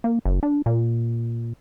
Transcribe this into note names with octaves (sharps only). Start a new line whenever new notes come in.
A#3
F#1
D4
A#2